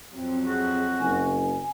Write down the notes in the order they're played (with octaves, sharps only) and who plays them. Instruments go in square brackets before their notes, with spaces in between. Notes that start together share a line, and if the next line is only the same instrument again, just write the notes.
[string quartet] F2 F#3 [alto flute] C4
[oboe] F#4 [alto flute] G#4
[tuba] F#1 [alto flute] G#5